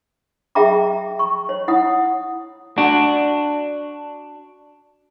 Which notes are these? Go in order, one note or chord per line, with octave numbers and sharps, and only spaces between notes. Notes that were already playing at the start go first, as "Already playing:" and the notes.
G#4 E5 G5 A#5 D6
C#6
C#5
E4 F#5 D#6
D4 F#4